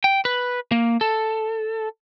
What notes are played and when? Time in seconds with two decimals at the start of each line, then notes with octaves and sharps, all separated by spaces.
0.04 G5
0.25 B4
0.72 A#3
1.01 A4